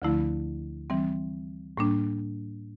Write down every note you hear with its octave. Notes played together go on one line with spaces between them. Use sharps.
D2 D3 F3 A3 E4
E3 G3 C4
A2 G3 A#3 D4